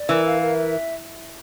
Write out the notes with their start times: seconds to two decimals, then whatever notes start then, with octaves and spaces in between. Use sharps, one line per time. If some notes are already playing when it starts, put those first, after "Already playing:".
Already playing: D5
0.09 E3 A#4
0.25 F5
0.41 A#4
0.57 E5